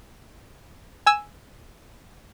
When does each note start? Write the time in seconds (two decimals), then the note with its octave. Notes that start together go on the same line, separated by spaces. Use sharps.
1.06 G#5 E6